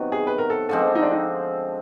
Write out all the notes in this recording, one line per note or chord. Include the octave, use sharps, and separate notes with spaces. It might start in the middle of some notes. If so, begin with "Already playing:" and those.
Already playing: C3 D#3 F#3 B3
G#4
B4
A#4
A4
D3 F3 G#3 C4 A4
D#4
D4
D#4